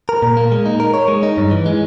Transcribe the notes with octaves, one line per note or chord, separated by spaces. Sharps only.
A#4
A#2
A#3
G#3
D#4
A#4
C#5
G#3
D#4
G2
E3
G#3